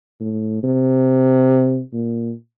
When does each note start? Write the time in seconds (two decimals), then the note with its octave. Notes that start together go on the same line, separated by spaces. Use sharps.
0.20 A2
0.63 C3
1.93 A#2